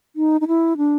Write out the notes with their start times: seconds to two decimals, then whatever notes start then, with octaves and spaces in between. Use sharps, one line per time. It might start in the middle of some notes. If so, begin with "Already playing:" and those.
0.16 D#4
0.41 D#4
0.48 E4
0.77 D4